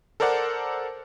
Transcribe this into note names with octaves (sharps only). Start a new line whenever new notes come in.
A4 A#4 C5 D5 F#5 A5